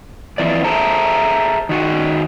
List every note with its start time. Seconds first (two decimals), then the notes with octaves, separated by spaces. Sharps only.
0.38 F2 E3 D5
0.64 G#4 A4 C5 E5 A5 A#5
1.69 D#3 F#4